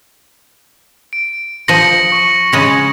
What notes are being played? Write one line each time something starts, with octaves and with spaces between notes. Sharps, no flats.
D7
F3 D#5 A#6 C#7 F#7
C#6
C#3 G#3 C#4